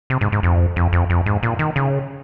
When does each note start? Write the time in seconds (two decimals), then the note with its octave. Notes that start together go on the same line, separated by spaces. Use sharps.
0.10 C3
0.21 G#2
0.32 G#2
0.43 F2
0.76 F2
0.93 F2
1.10 F2
1.26 G#2
1.43 A#2
1.59 D#3
1.76 C#3